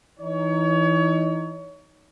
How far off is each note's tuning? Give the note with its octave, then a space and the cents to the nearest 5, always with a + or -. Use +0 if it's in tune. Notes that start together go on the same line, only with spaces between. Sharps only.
E3 +0 D#4 +0 C#5 +30